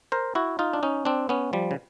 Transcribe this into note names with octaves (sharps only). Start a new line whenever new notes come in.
A#4 C5
E4 F#4
D#4 F4
D4
C#4 D#4
C4 D4
B3 C#4
F3 G3
C#3